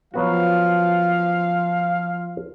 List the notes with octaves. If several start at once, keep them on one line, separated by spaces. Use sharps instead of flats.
F3 F#3 B3 F#4 F5